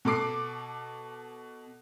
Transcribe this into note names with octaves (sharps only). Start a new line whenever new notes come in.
B2 A4 D6 C7